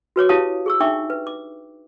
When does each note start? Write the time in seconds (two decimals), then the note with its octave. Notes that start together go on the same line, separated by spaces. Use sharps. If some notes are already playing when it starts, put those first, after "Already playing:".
0.16 F#4 B4 C#5 D6
0.29 E4 G4 C#5 F5 A5 D#6
0.66 G#4 C#6 E6
0.80 D4 D#4 E5 G5 C#6 D6
1.10 B4
1.27 D6